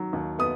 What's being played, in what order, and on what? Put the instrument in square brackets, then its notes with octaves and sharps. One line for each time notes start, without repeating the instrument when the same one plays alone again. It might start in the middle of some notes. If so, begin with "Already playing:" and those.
Already playing: [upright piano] D#3 F#3
D#2
B3 D#6